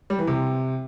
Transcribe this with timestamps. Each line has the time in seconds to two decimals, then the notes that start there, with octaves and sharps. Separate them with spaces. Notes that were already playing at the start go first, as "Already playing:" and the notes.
0.10 G3
0.19 E3
0.27 C3